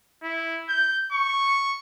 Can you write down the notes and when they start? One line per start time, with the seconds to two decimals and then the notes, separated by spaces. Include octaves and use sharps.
0.23 E4
0.69 G6
1.12 C#6